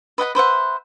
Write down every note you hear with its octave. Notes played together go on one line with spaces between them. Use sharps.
B4 D#5 F#5 B5
B4 C5 E5 F#5